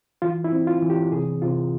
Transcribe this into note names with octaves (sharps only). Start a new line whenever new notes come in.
E3 F4
E4
C4
F4
E3
G4
C3 G#4
C3 F4